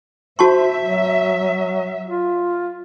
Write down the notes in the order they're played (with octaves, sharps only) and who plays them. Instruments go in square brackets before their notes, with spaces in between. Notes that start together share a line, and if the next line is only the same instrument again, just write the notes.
[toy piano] F#4 A5 C#6 [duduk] C5 [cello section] E5
[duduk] F#3
F4